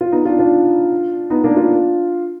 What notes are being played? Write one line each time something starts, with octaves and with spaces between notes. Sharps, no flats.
F4
B3 D#4
D4 F4
D4 F4
B3 D#4
A#3 D4
D4 F4